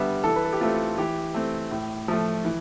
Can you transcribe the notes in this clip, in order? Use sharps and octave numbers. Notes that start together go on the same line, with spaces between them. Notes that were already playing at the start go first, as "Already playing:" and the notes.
Already playing: D3 G3 B3 E5
E3 A4
B4
A4
G4
A3 C4 F4
E3 G4
A3 C4
A2
F3 A3
E3